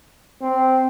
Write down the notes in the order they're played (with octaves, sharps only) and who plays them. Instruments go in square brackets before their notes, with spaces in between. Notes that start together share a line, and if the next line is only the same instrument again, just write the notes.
[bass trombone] C4